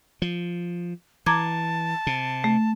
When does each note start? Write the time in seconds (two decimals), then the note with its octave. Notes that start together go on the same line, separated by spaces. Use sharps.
0.22 F3
1.26 E3 A5 A#5 D6 G#6
2.07 C3
2.44 A3